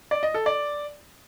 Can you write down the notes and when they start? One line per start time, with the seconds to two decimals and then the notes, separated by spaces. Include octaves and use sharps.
0.11 D5
0.23 D#5
0.34 A4
0.46 D5